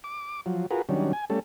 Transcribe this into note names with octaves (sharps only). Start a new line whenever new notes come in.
D6
F3 F#3
F4 F#4 G#4 A#4 B4
D#3 F#3 G3 C#4 D4
G#5
G3 A3 C#4 A4